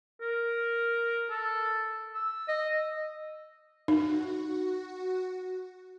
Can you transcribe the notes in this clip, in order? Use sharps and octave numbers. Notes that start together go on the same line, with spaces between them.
A#4
A4
E6
D#5
D#4 F#4